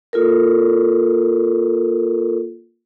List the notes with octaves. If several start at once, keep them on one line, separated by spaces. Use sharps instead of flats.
A#3 F4 A4 A#4